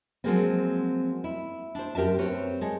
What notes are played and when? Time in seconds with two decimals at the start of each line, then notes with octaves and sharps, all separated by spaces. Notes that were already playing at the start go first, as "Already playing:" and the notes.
0.24 F3 F#3 G#3 A#3 C4
1.24 E4
1.75 D4 C5
1.95 F#2 G4 A#4 E5 A5
2.19 C4 B4 C#5
2.61 G#3 A4